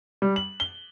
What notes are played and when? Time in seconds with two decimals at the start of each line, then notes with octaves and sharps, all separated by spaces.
0.22 G3
0.36 F#7
0.60 G7